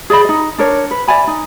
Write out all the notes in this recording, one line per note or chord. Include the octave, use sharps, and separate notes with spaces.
G#4 D5 D#5 B5
D#4 D#5
D4 A#4 C#5
B4
D5 E5 G#5 B5
D#4